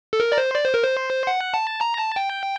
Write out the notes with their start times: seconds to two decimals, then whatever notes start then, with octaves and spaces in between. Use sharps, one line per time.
0.13 A4
0.20 A#4
0.32 D5
0.38 C5
0.55 D5
0.65 C5
0.74 A#4
0.83 C5
1.27 F#5
1.54 A5
1.81 A#5
1.98 A5
2.16 G5